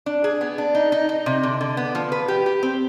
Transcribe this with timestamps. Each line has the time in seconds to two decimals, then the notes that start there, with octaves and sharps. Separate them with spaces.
0.06 D4
0.24 G#4
0.41 B3
0.58 D4
0.75 D#4
0.92 D#4
1.09 D#4
1.26 C3
1.43 D3
1.61 D3
1.77 B3
1.95 F3
2.12 B4
2.28 G4
2.46 G4
2.63 C4